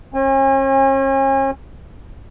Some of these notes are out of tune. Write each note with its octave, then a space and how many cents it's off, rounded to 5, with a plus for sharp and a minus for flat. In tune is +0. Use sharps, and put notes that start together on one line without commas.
C#4 -40 G#5 -35